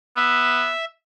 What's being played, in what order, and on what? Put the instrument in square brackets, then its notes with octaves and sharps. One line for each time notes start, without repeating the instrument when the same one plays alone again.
[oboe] B3 [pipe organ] E5